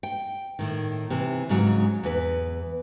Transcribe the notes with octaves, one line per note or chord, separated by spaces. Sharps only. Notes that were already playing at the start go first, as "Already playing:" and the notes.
G5
A2 D#3
C3 E3
G#2 C#3 F#3 G#3
E2 B4